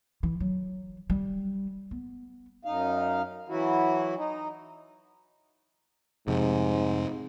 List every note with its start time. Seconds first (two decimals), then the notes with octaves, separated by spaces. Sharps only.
0.23 E3
0.40 F#3
1.10 G3
1.91 B3
2.65 F#2 D#4 F5
3.48 E3 F#3 E4 F#4
4.17 D#4
6.28 F2 G#2 C3